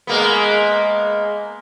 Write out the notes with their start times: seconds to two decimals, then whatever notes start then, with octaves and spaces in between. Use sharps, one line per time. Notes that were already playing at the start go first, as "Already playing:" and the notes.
0.07 G#3 A#3 B3